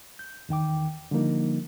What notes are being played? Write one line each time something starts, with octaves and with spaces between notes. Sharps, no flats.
G6
E2 D#3 G5 D6
D3 F3 G3 A#3 D#4